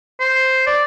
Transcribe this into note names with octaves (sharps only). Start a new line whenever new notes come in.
C5
D5